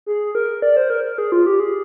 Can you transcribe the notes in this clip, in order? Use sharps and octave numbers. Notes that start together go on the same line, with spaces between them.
G#4
A#4
D5
C5
A#4
A#4
G#4
F4
G4
G#4